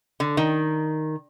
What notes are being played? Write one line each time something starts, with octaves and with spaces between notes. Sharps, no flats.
D3
D#3